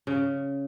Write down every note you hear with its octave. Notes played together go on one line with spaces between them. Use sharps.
C#3